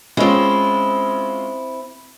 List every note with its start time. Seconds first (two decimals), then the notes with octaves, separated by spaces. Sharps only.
0.17 G#3 C4 C#4 E4 F4